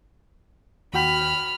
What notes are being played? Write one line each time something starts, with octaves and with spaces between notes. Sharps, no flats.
D#2 F#4 G5 B5 F6